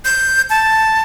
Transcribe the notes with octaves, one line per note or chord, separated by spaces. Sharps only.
G6
A5